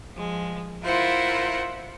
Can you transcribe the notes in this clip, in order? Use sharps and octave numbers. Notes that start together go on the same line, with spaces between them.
F3 G#3
E4 F4 A#4 C5 E5 F#5